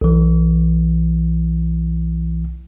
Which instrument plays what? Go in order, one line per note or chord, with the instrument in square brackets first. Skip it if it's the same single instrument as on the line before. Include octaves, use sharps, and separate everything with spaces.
[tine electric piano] B1 E3